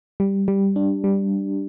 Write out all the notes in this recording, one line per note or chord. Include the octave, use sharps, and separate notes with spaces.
G3
G3
D4
G3